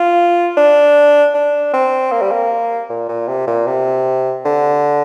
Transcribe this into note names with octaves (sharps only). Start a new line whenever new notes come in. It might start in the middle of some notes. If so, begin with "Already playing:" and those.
Already playing: F4
D4
D4
C4
A#3
G3
A#3
A#2
A#2
C3
A#2
C3
D3